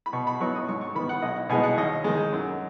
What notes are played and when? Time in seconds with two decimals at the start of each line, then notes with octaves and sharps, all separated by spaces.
0.06 B5
0.13 B2 C#6
0.27 B5
0.40 F#3 B3 D#4 C#6
0.55 D#6
0.68 G#2 C#6
0.81 C#6
0.95 D#3 B3 B5
1.09 F#5
1.22 B1 D#5
1.36 F#5
1.50 B2 G#3 B3 D#4 G#5
1.64 F#5
1.77 D#2 D#5
2.04 D#3 G#3
2.32 F#2